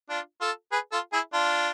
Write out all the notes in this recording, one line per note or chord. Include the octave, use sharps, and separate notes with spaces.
D4 F4
F4 A4
G#4 B4
F4 A4
E4 G#4
D4 F4